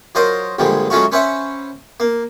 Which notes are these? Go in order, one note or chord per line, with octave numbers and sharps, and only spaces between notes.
F#3 F4 A#4 C5 D#5
A#1 G2 D3 G3 G#3
F#3 G#3 A3 C#4 F4 F#4
C#4 B4 C5 E5 F#5
A#3